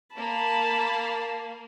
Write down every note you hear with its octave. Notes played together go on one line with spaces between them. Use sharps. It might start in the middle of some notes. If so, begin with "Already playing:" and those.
A#3 A5 B5